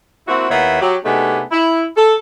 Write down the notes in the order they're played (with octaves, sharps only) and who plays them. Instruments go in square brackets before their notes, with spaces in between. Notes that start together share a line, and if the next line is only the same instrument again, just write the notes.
[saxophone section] A#3 C4 E4 F#4
D#2 A#3 B3 E4 C#5 E5
F#3 G4
C3 A3 B3 D4 D#4 G#4
E4
A4